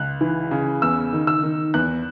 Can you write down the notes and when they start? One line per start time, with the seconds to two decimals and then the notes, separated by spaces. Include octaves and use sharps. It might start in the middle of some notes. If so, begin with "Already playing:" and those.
Already playing: C#2 F#6
0.21 E3
0.51 C#3
0.82 E2 E6
1.13 D#3
1.27 E6
1.43 D#3
1.74 E2 F#6